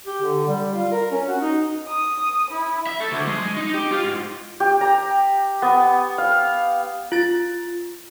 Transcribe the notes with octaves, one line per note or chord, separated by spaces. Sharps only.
G4
D3
G3
F4
A#4
C#4
F#4
D#4
D#6
E4
E5
A4
D2
G#3
G#3
D#4
G4
F4
G#2
G4
A#5
B3
F5
F4 A6